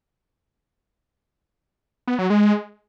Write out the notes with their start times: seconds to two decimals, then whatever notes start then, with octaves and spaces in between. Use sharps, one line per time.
2.08 B3
2.19 F#3
2.30 G#3